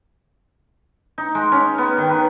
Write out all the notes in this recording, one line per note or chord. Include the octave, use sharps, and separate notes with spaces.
D#4
G#3
C#4
B3
D#3
B4